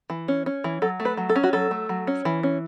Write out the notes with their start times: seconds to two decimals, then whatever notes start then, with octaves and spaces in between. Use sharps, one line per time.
0.10 E3
0.28 C#4
0.46 C#4
0.64 E3
0.82 F#3 A4
1.00 A3
1.05 B4
1.17 F#3
1.29 A4
1.36 C#4
1.44 F#4
1.53 F#3 A4
1.71 A3
1.89 F#3
2.07 C#4
2.25 E3
2.43 C#4